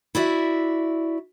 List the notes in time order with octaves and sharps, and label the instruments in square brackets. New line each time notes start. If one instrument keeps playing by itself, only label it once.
[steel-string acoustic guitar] E4 F#4 D5 E5